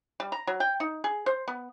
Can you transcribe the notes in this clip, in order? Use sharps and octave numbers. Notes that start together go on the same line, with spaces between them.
G3
A#5
F#3
G5
D#4
G#4
C5
B3